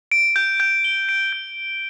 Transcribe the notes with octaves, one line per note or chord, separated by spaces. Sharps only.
D7
G6
G6
G7
D7
G6